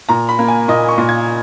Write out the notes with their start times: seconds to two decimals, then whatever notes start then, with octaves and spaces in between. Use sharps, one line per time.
0.09 A#2 A#5
0.29 B5
0.39 A#3
0.48 G#5
0.68 A#2 D#5
0.89 C#6
0.98 A#2
1.09 G#6